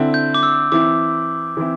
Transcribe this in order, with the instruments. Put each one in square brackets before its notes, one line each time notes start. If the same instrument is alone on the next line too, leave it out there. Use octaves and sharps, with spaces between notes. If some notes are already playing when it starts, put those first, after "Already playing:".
Already playing: [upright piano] D3 C4 E4
[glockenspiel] G6
D6
E6
[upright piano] E3 C4 E4 [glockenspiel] D6
[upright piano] E3 C4 E4